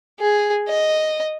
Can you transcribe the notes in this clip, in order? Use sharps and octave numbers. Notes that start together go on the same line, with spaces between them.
G#4
D#5